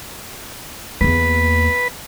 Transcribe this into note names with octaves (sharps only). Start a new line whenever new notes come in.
E2 A#3 B4